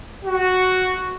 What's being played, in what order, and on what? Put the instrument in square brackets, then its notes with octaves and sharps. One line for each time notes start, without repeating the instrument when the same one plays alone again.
[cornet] F#4